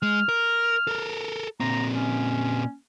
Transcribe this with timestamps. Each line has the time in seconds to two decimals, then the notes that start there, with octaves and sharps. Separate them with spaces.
0.02 G#3 F6
0.29 A#4
0.87 A4 A#4
1.60 A#2 C4 A#5
1.93 C#4